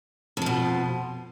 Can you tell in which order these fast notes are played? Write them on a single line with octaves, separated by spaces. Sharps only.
F2 F3 B2